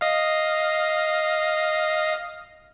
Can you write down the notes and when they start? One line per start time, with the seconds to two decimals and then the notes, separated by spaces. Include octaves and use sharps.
0.01 D#5 F5